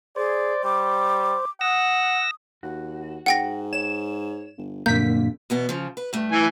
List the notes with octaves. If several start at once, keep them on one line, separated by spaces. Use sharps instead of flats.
G#4 C5 D5
G3 D6
F#5 D#6 E6 A#6
D#2 F#4
G#2 F#5 G5 A#6
C#5 E7
G1
F1 F#2 A#2 D3 A#3 G6 B6
E2 B2 B3
C#3 F3
B4
G2 A3
E3 G#5